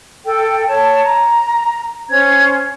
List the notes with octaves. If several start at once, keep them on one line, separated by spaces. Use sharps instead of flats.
A4 G5
C#5 A5
A#5
C#4 C5 G#6